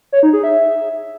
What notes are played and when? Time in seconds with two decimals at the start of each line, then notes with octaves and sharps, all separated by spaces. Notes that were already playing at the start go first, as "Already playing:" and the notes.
0.12 C#5
0.23 D#4
0.33 G#4
0.43 E5